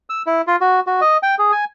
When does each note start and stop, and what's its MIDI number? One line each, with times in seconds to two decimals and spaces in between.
0.10 0.22 88
0.27 0.41 64
0.47 0.56 65
0.61 0.80 66
0.87 1.00 66
1.01 1.17 75
1.23 1.35 79
1.39 1.52 68
1.52 1.65 80